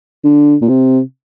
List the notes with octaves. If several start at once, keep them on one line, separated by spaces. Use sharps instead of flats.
D3
A#2
C3